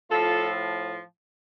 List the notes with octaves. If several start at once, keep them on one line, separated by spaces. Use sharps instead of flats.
A2 F3 F4 A4